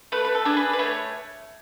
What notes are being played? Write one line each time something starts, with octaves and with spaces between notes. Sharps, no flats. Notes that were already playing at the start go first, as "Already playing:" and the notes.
A3 B4
B4
A4
D4 G#4
B4
B4
A3 C#5